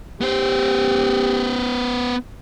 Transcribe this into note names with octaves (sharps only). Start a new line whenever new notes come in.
B3 G4 C5